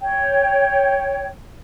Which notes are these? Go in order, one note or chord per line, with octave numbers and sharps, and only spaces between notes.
C#5 G5